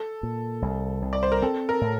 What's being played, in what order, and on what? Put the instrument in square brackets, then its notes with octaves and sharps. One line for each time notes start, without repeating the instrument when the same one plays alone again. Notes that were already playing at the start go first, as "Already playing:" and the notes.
Already playing: [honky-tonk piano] A4
[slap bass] A#2
C2
C2
[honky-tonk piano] D5
C5
A#4
[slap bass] C4 [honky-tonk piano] A4
[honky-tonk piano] A#4
[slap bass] A2